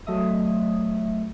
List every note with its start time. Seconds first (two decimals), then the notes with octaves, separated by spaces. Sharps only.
0.06 F#3 A3 D#5 E5 D#6